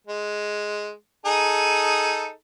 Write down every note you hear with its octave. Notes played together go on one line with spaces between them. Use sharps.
G#3
D#4 G#4 A4